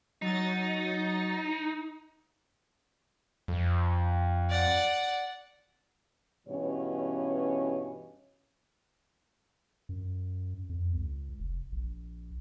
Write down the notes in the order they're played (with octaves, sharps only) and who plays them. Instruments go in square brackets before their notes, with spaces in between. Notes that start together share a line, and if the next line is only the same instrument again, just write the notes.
[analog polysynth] F#3 A6 [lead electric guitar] D#4
[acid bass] F2
[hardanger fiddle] D5 F#5
[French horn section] G2 B2 E3 C#4 C#5
[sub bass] F#2
F2
C#2
F1
A#1